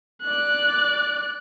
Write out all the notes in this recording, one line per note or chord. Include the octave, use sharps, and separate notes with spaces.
D5 F#6